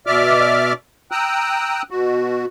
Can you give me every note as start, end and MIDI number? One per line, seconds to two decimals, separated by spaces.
0.07 0.73 47
0.07 0.73 74
0.07 0.73 76
0.07 0.73 86
0.07 0.73 89
1.11 1.82 79
1.11 1.82 82
1.11 1.82 87
1.11 1.82 88
1.11 1.82 90
1.91 2.46 47
1.91 2.46 66